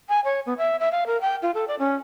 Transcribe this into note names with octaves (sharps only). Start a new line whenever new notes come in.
G#5
C#5
B3
E5
E5
F5
A#4
G5
F4
A4
D5
C#4